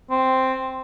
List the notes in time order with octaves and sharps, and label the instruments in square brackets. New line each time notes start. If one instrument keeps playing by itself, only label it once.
[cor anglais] C4